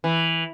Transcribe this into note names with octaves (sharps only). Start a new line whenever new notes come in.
E3